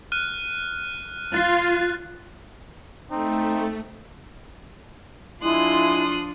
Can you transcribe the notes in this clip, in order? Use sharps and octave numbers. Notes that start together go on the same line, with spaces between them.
F6 F#6 D#7
F4 F#6 A6
A3 C4 D#4
F3 G#3 D4 E4 F4 C6 D#6 F#6